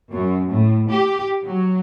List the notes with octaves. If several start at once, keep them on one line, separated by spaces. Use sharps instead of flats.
F#2
A2
G4
F#3